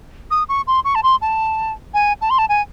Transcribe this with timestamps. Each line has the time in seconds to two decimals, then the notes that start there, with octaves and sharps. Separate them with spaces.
0.31 D#6
0.49 C#6
0.67 C6
0.85 C#6
0.95 A5
1.03 C6
1.21 A5
1.94 G#5
2.21 A5
2.30 C6
2.38 A5
2.49 G#5